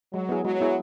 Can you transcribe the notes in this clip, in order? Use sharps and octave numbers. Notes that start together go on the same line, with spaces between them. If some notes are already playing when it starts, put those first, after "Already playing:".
F#3 G#3
B3 E4 G#4
F#3 G#3
B3 E4 G#4